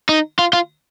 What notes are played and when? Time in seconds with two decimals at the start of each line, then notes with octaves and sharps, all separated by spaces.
0.09 D#4
0.39 F4
0.53 F4